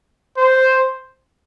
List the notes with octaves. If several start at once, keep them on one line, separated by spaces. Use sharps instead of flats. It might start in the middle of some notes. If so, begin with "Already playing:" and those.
C5